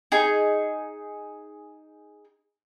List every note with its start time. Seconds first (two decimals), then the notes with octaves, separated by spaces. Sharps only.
0.12 D#4 G#4